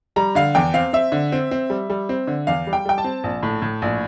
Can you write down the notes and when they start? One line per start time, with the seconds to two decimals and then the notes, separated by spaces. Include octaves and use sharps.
0.16 G3 A#5
0.35 D3 F5
0.55 E2 G5
0.74 C4 F5
0.93 C4 E5
1.12 D3
1.32 C4
1.51 C4
1.70 G3
1.90 G3
2.09 C4
2.27 D3
2.47 E2 F5
2.67 G3
2.73 G5
2.85 G3 G5
2.98 A5
3.04 C4
3.24 A#1
3.43 A2
3.62 A2
3.82 A#1